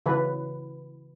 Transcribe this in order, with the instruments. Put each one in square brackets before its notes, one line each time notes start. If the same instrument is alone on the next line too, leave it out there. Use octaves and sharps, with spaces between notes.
[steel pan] C#3 E3 B4